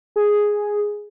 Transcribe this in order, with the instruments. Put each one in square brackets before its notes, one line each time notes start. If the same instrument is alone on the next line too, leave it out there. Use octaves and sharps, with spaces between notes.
[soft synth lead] G#4